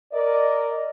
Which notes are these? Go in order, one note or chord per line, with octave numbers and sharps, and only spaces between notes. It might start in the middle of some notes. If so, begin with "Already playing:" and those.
A#4 D5 D#5